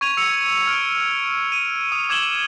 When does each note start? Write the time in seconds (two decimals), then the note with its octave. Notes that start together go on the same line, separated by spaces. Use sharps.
0.01 C#6 G#6 D#7 F7
0.17 E6 C#7 F7
0.67 F6 D7
1.52 D#7
1.92 D#6
2.09 D6 G#6 E7 F#7 G7